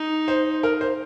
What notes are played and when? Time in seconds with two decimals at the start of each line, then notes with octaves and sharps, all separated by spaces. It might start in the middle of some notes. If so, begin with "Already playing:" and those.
Already playing: D#4
0.28 C5
0.63 A#4
0.81 C5